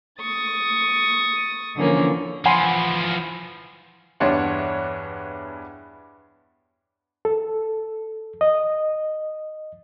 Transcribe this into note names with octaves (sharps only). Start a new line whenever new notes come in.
C#6 D#6 A6
D3 E3 F3 A#3 C#4
E3 F3 F#5 G#5 B5 C6
E2 G2 D4 C#5 F#5 C6
A4
D#5